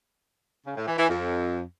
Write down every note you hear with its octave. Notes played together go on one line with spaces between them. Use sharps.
C#3
A2
E3
E3
F2